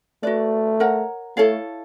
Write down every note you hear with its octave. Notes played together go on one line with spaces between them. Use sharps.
A3 F#4 B4 D5
A#4 C#5 F#5 A#5
A3 E4 A4 C#5 F5